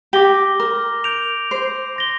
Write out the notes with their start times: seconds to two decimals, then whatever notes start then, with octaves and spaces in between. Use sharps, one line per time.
0.13 G4 D6 A#6 G7
0.60 A#4
1.04 G6 D7 F7
1.51 C5
1.96 C6 A#6 G7